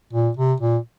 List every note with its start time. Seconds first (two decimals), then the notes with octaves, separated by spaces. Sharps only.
0.13 A#2
0.37 C3
0.60 A#2